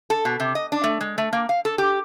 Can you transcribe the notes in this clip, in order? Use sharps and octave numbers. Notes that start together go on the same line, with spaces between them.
A4
B2
C3
D#5
D4
A3
G#3
A3
A#3
F5
A4
G4